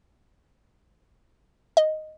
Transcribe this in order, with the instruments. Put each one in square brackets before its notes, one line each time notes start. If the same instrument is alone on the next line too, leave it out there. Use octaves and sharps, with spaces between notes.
[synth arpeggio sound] D#5